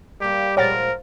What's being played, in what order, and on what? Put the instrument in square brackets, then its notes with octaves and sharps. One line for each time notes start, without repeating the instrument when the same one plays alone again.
[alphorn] G3 [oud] A#3 A#4 [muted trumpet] G4
[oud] A#2 F3 G#3 [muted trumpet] A#4 [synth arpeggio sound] C#5 F#5 A6